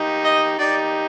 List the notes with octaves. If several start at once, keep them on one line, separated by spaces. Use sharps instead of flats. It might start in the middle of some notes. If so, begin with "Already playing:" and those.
Already playing: D#4 G4
D#5
D#4 G4 D5